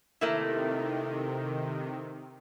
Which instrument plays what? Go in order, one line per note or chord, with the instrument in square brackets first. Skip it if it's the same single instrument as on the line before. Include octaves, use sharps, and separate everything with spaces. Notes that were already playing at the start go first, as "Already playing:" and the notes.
[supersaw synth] C3 D#3 [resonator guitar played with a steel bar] A3 A#3 E4